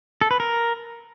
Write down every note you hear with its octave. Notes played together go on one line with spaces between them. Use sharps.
A4
B4
A#4